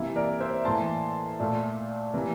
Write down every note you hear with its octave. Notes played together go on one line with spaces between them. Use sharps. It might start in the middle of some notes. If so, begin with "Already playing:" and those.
Already playing: C3 E3 A#3 E4
A#4 D5
C5 E5
A2 E3 A#3 A5 C6
A#2 A3
C3 E3 A#3